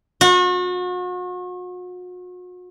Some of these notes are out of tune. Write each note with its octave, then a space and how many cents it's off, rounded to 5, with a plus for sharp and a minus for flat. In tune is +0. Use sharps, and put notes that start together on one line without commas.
F#4 -40